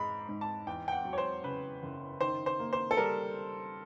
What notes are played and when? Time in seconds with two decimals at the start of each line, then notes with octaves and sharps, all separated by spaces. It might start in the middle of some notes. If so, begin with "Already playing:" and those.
Already playing: G#2 G#3 B5
0.29 G#2
0.41 A5
0.66 E2 G5
0.88 G5
0.92 F#5
1.05 F#3
1.13 C#5
1.18 C5
1.44 C#3 B4
1.83 F#1
2.20 D#3 C5
2.46 C5
2.59 A#3
2.73 C5
2.91 A4
2.97 G3 A#4